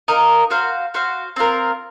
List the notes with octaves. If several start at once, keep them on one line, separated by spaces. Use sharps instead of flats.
A#3 D#4 A#4 D#5
F#4 C5 F5
F#4 C5 F5
C4 F4 A#4